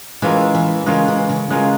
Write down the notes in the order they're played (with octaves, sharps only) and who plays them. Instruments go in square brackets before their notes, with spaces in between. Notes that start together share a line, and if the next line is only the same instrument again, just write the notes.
[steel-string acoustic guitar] E3 [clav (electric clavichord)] G#3 C#4 F4 A#4
[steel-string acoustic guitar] E3
[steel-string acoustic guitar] C#3 [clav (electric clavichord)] G#3 C#4 F4 A#4
[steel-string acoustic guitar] E3
C#3
[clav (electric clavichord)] G#3 C#4 F4 A#4